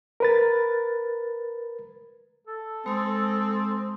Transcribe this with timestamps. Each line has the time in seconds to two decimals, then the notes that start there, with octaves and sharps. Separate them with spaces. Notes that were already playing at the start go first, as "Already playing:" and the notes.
0.20 A#4 B4 A6
2.47 A4
2.86 G#3 C4 D#6